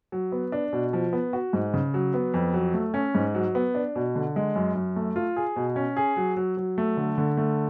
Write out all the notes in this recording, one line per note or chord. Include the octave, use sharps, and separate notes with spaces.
F#3
B3
D4
B2
F3
B3
F#4
G#2
C#3
F#3
B3
F2
F#3
A3
C#4
G#2
F#3
B3
D4
B2
D3
G#3
F#2
F#2
A3
F4
G#4
B2
C#4
G#4
F#3
F#3
F#3
A3
D3
D3
A3